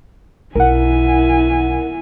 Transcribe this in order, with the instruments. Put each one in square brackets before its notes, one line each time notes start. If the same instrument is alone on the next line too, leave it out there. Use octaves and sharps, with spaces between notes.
[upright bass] B1 [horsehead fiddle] E4 G#5 [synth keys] A#4 F#5